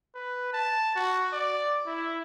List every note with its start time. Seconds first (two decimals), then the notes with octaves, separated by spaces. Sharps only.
0.14 B4
0.53 A5
0.95 F#4
1.32 D5
1.86 E4